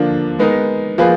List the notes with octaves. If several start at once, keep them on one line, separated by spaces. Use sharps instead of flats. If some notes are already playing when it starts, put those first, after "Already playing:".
Already playing: D3 F3 A#3 D4
G#3 B3 D#4 A#4
F3 A#3 F4 G#4 B4